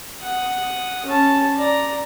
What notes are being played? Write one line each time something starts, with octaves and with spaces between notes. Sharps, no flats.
F#5 D#6
C#4 A5
D5 A#5